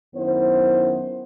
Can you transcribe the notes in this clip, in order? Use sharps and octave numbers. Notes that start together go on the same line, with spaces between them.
F#2 D#3 B3 E4 C5